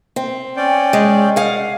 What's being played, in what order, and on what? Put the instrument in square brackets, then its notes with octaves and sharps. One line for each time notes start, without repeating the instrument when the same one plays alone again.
[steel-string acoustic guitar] C4
[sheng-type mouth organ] C#4 D5 G5
[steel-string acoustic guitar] G#3
G#4 F5 F#5